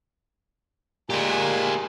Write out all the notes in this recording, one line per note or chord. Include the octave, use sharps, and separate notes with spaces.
A#2 G#3 G4 A#4 G#5